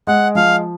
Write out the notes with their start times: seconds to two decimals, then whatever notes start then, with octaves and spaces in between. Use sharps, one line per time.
0.07 G#3 F#5
0.35 F3 F5